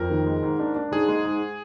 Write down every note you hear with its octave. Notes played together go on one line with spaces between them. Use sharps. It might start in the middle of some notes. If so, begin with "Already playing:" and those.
Already playing: F2 A#4
D#3
G#3
G#2
D4
D4
G#2 G#4
G#3
G#2